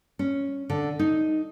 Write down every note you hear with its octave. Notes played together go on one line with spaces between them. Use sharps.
C#4
D3
D#4